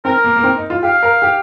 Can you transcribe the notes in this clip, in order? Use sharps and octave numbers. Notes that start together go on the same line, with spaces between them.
C4 A#4
A#3
A#3
C4
D#4
F4
G4 F5
A#4
G4